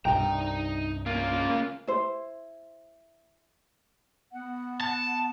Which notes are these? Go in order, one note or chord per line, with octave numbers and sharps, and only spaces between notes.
C2 G2 D#4 G5 A#5
C#3 A#3 F4
E4 C5
B3 F#5
A5